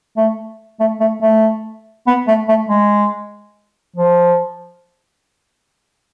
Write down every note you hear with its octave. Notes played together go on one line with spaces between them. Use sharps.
A3
A3
A3
A3
B3
A3
A3
G#3
F3